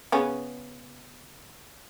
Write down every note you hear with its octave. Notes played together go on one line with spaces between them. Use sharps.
C#3 B3 C#4